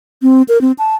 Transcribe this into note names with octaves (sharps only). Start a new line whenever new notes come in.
C4
A#4
C4
A5